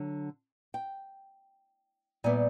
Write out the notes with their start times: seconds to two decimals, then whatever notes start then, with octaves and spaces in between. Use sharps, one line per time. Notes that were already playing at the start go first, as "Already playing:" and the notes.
Already playing: D3 F#3
0.74 G5
2.24 A#2 G3 B3 E4 G#5